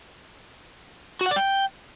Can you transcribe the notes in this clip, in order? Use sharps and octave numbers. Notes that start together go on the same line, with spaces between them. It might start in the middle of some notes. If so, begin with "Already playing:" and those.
F#4
F#5
D5
G5